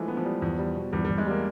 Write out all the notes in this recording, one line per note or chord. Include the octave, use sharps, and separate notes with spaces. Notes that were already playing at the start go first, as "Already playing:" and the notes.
Already playing: E3 F3 G#3 A3
B3
F3
G3
E2
G3
B2
E2 G3
E2 G3
G#3
G3 A#3